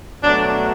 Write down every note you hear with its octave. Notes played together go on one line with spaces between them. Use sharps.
B2 F#3 A3 D4